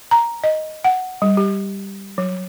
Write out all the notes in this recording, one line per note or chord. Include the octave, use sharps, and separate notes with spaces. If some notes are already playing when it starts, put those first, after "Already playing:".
A#5
D#5
F#5
G3
G4
F#3